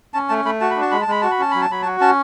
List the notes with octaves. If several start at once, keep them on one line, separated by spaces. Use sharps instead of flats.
C#4 A5
A3 A5
A3 B5
F#4 A5
B5
D4
A5
G#3 B5
A5
G#3 B5
F#4 A5
B5
C#4 A5
F#3 B5
A5
F#3 B5
A5
F#4
C#4 A5